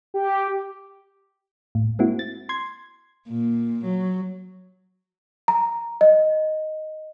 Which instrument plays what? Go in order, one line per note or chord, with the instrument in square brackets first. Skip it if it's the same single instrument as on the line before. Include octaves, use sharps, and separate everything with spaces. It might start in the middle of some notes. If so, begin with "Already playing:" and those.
[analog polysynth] G4
[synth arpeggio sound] A2
G#3 A#3 C4 E4 F#4
A6
C6 G#6
[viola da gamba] A#2
F#3
[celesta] A#5
D#5